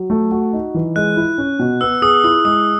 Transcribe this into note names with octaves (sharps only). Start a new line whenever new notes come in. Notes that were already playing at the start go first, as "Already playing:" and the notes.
Already playing: F#3
A3
F#4
D#4
E3
G#3 F#6
E4
C#4
B2
B3 E6
G#4 D#6
E4 D#6
G#3 D#6